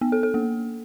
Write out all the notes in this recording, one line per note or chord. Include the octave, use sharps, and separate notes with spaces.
B3
A4
A4
A#3